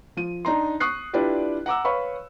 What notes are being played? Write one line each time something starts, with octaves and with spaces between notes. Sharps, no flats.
F3 D#7
D4 D#4 A#5 C6
C#6 D#6 F#6 C7
D4 E4 F4 G4 B4 D5
F#5 A#5 D6 E6
B4 C#5 F5 B5 C#6